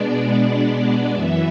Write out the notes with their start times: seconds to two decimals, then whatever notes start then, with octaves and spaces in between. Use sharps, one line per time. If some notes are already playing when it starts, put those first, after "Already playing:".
Already playing: B2 G#3 B3 D4 D5
0.27 D5
1.12 F#2 E3 B3 E5